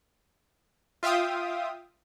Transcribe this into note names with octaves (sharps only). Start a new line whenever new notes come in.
F4 E5 F5 G5 D#6